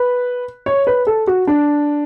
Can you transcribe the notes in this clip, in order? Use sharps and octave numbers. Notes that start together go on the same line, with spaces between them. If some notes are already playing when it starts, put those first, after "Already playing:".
Already playing: B4
C#5
B4
A4
F#4
D4